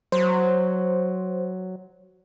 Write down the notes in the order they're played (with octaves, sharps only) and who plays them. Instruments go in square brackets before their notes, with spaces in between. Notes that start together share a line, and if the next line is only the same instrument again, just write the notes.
[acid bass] F#3 [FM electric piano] C5